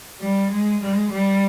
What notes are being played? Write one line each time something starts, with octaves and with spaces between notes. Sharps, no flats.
G3
G#3
G#3
G3